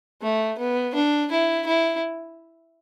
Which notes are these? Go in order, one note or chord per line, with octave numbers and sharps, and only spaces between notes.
A3
B3
D4
E4
E4